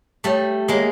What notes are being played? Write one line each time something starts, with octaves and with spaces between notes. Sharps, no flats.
G3 A3
G#3 A#3